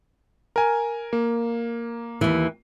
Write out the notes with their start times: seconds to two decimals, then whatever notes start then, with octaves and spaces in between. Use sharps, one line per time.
0.56 A#4 G#5
1.13 A#3
2.21 D#2 E3